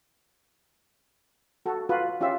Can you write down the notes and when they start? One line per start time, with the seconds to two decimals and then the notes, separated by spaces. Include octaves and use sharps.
1.66 F#4 A4
1.89 F4 F#4 B4
2.21 C#4 F4 G4 E5